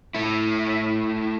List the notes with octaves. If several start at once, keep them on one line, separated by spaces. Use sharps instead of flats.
A3 E4